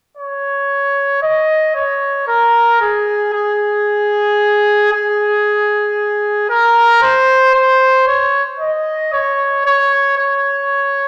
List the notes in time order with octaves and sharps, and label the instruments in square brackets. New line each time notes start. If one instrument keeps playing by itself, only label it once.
[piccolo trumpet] C#5
D#5
C#5
A#4
G#4
G#4
G#4
A#4
C5
C5
C#5
D#5
C#5
C#5
C#5